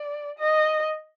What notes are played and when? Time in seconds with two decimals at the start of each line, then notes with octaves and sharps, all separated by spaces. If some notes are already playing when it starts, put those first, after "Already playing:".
Already playing: D5
0.39 D#5